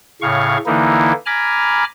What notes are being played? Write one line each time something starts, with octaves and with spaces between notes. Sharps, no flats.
A2 C#3 F5 C#6
D3 E3 A#3 D#4 E4
G#5 A#5 B5 D6 F6